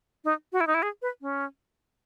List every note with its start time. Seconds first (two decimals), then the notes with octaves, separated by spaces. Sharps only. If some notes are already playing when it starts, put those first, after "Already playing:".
0.24 D#4
0.53 F#4
0.61 E4
0.67 D#4
0.74 E4
0.83 G#4
1.02 B4
1.21 C#4